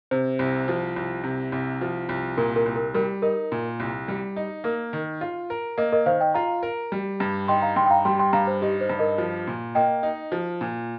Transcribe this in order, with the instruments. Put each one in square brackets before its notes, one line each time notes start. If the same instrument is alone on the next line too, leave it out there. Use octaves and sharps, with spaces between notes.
[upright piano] C3 [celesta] C5
[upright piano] C2
F3
C2
C3
C2
F3
C2
[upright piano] A#2 [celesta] A#4
[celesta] A#4
[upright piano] C2
[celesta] A#4
[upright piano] G3 [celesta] A#4
[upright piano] D#4 [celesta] A#4
[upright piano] A#2
C2
G3
D#4
[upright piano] A#3 [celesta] A#4
[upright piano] D#3
F4
A#4
[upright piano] A#3 [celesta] A#4 D#5
[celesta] A#4 D#5
[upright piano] D#3 [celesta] C5 F5
[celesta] D#5 G5
[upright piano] F4 [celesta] F5 A#5
[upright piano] A#4
G3
G2
[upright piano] D#4 [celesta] G5 C6
[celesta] F5 A#5
[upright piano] G2 [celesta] G5 C6
[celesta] G5
F5 A#5
[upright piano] G3 [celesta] G5 C6
[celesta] G5 C6
[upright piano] G2 [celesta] F5 A#5
[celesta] C5
[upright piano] D#4 [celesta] G4
[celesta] C5
[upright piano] G2
[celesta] A#4 D#5
[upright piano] F3
A#2
[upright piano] A#3 [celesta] D#5 G5
[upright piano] D#4
F3
A#2